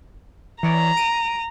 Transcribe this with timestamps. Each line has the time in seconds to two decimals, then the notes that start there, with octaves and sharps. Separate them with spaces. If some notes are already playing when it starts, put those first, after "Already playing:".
0.63 E3 C#5 D5 A#5
0.97 D7 D#7